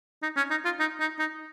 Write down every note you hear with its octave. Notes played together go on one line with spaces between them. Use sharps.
D#4
C#4
D#4
F4
D#4
D#4
D#4